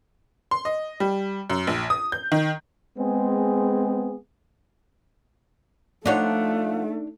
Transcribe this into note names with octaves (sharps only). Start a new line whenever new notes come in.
C6
D#5
G3
F#2
A#1
D#6
G6
D#3
G#3 B3 C4 G#4
F3 A3 D4 D#4 F4 C#5 F#5